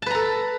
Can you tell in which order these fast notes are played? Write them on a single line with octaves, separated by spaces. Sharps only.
A5 B4 A#5 A4